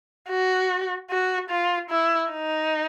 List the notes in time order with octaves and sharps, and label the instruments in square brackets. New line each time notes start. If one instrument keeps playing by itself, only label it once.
[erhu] F#4
F#4
F4
E4
D#4